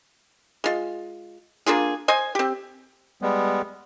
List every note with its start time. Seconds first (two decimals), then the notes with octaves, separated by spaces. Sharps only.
0.64 G#3 F4
1.66 A#3 D4 F4 G#4
2.08 C5 D#5 G#5
2.35 C4 G4
3.22 G3 G#3 B3